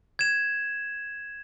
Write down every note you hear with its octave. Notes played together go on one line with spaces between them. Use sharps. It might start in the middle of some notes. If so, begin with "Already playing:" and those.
G#6 E7